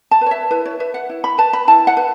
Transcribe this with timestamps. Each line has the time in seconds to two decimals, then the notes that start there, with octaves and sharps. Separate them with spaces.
0.11 A5
0.21 B4
0.26 C#5
0.31 E5
0.51 E4 B4
0.66 C#5
0.80 B4 E5
0.94 F#5
1.10 E4
1.24 B5
1.38 B4 A5
1.53 B5
1.68 E4 A5
1.87 F#5
1.97 B4